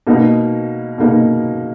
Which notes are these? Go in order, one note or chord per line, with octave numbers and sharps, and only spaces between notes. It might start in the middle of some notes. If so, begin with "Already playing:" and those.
B2 A#3 D#4
B2 A#3 D#4